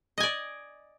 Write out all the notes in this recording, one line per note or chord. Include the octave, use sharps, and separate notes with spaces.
D5 D#5 G#5